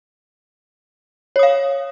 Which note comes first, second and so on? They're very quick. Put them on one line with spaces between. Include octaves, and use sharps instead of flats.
C#5 D#6 F5